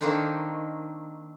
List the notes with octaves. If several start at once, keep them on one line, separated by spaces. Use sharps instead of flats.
D#3 A#3 C4 D4 D#4